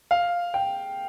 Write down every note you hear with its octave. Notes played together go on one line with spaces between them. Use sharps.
F5
G5